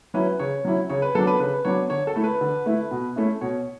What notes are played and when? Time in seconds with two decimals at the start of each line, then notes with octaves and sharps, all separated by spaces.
0.14 F#3 C#4 E4 B4
0.39 C#3 C#5
0.65 F#3 C#4 E4
0.89 C#3 C#5
1.02 B4
1.15 F#3 B3 D4 A4
1.27 B4
1.40 C#3 B4
1.65 F#3 B3 D4 C#5
1.90 D3 C#5
2.07 A4
2.16 A3 E4
2.24 B4
2.41 D3
2.66 A3 E4
2.91 B2
3.16 A3 C#4 E4
3.41 B2 C#5